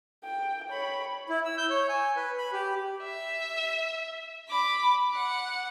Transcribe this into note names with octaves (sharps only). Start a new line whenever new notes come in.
G5
C#5 B5
E4
E6
G6
C#5
G#5
B4
B5
G4
E5
B5 D6
F#5